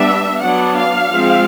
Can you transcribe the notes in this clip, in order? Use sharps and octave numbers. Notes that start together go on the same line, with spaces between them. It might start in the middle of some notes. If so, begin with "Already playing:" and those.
Already playing: G3 B3 D4 E5
F#3 B3 D4 F#5
F5
F3 G#3 C4